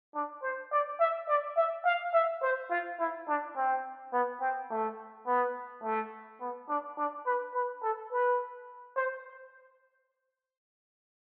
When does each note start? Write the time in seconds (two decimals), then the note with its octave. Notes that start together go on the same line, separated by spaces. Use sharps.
0.15 D4
0.43 C5
0.72 D5
1.00 E5
1.28 D5
1.57 E5
1.85 F5
2.14 E5
2.43 C5
2.70 F4
2.99 E4
3.28 D4
3.56 C4
4.13 B3
4.41 C4
4.70 A3
5.27 B3
5.83 A3
6.41 B3
6.69 D4
6.97 D4
7.26 B4
7.54 B4
7.83 A4
8.11 B4
8.97 C5